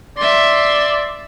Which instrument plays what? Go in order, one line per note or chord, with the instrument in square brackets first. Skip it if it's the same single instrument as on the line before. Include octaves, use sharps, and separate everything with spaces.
[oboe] D5 [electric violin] E5 C6